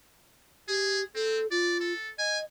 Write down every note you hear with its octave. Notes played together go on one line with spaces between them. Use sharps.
G4 G#4
C4 A4
F4 D5
A4
D#5 G#5